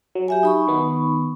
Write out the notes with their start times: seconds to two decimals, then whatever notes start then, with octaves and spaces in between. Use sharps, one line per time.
0.15 F#3
0.28 G4 E5 G#5
0.43 D#4 B5 C#6
0.68 D#3 B3